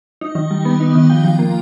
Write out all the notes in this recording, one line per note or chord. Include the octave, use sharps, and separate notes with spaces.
D#4
D#3
G3
B3
D#4
D#3
F3 G5
F3
A#3